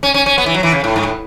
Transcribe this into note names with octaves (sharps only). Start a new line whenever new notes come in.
C#4
C#4
C#4
B3
E3
F#3
E3
C#3
A2
G#2
A2